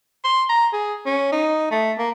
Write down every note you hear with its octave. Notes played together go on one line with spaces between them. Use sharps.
C6
A#5
G#4
C#4
D#4
A3
A#3